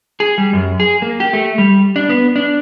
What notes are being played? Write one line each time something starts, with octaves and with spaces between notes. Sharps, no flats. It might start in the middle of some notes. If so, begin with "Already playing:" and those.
G#4
G3
F#2
G#4
A#3
G4
A3
G3
D4
B3
D4